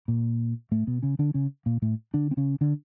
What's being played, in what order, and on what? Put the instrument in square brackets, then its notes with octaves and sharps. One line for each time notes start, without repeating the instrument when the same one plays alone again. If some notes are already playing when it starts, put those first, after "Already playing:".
[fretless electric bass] A#2 A#3
A2 A3
B2 B3
C#3 C#4
D3 D4
C#3 C#4
A#2 A#3
A2 A3
D3 D4
C4
C#3 C#4
D3 D4